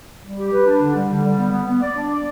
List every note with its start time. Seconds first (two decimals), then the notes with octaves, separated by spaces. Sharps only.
0.22 G3
0.38 G4
0.52 B4
0.66 D4
0.81 D3
0.95 G3
1.10 D3
1.23 G3
1.38 B3
1.52 B3
1.67 B3
1.82 D5
1.96 D4
2.11 D5